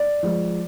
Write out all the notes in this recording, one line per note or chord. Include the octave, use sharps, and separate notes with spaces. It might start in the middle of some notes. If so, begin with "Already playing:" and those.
Already playing: D5
F3 G#3